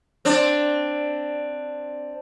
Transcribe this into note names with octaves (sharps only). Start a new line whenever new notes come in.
C4 D4